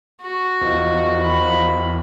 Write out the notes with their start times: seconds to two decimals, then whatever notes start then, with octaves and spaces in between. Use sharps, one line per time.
0.22 F#4
0.61 E2 D#3 F3
1.21 B5